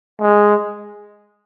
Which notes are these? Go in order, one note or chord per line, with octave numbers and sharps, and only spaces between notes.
G#3